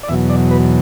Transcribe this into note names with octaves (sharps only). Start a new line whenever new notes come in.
D5
E2 B2 F#3 E5
D5
B4